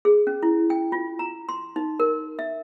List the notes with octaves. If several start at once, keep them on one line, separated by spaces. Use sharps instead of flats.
G#4
C#4
E4
G5
F4
A#5
C6
D#4
A#4
E5